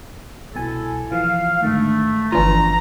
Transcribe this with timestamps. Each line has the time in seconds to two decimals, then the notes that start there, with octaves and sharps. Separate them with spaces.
0.55 C2 B2 E4 A4 G#5
1.12 E3 F3 F5
1.63 G#2 D3 D#3 A3
2.32 G1 E3 F3 D4 F4 A#5